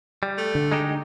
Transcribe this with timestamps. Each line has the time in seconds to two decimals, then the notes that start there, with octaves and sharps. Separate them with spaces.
0.23 G3
0.38 A3
0.55 D3
0.72 G#3 D#4 G4